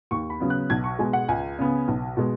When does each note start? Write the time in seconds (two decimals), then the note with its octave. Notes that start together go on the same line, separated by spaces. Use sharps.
0.11 D#2 C#6
0.30 B5
0.40 C#3 F#3 B3
0.50 F#6
0.70 B1 G#6
0.84 C#6
0.99 B2 G#3 G#5
1.13 F#5
1.28 C#2 G#5
1.59 C#3 B3
1.88 B1
2.17 B2 G#3